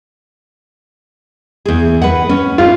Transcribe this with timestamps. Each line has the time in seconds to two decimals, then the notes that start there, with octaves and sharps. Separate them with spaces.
1.65 E2 G#4
2.02 B4 F#5
2.29 C#4
2.58 G#2 F4